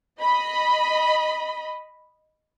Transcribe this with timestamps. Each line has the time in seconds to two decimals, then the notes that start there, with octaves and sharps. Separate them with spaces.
0.21 D#5 B5